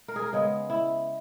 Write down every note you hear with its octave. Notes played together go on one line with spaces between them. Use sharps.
A#4
G#4
A#4
C#3 G#3 B3 G#4
E4